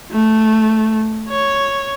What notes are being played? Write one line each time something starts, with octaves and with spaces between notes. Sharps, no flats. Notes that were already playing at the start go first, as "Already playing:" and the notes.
A3
C#5